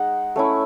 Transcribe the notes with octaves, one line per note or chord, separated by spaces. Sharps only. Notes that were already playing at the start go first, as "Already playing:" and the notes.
Already playing: G#3 D#4 F#5
A3 C#4 E4